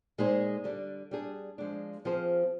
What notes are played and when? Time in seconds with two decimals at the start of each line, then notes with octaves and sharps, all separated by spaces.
0.18 A#2 G#3 D#4 G#4 C5
0.64 D3 G3 D4
1.11 G3 D4 G#4
1.58 F3 G#3 D4
2.05 F3 C4 F4 G#4 C5